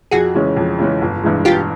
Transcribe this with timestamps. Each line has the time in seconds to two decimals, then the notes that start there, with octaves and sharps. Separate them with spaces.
0.11 F2 F#4 G#4
0.34 C#3 E3 G#3 C#4
0.57 F2
0.79 C#3 E3 G#3 C#4
1.01 G1
1.23 G2 E3 G#3
1.45 G1 F4 G4